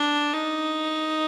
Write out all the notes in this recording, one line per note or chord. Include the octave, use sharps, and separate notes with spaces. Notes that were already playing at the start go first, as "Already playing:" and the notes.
Already playing: D4
D#4